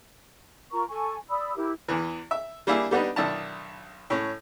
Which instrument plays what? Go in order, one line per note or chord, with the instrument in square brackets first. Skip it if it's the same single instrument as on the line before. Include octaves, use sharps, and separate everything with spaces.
[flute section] F4 A#4 A#5 C#6
A4 G#5 C#6
D5 B5 D#6 E6
E4 G4 A#4
[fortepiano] E2 E3
E5
G3 A#3 D4 E4 G#4
G3 B3 D4 D#4
B1 D#3 D4 E4 A5
A2 C#4